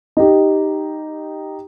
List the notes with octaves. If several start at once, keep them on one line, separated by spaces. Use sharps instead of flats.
D#4 G4